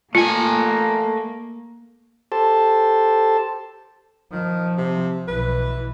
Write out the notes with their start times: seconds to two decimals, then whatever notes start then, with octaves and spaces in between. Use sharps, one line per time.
0.15 A3 A#3 F4 G#5
2.32 G4 A4 C5 A5
4.32 D#3 F3
4.77 C3
5.28 B1 E3 B4